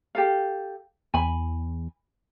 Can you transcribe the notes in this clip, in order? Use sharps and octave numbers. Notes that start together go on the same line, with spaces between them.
G4 A4 F5
E2 G#5 B5